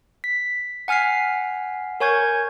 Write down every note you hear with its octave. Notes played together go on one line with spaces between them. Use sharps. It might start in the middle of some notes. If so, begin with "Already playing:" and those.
B6
F#5 G#5 F6 B6 C7
A#4 C#5 G#5 C#6 G6 G#6